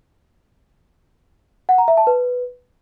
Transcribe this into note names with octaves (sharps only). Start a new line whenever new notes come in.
F#5
A#5
E5
A5
B4